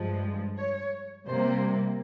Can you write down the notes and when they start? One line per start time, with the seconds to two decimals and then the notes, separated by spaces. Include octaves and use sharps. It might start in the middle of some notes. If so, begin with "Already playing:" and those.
Already playing: G2 F3 G#3
0.57 C#5
1.26 C3 G3 A#3 C5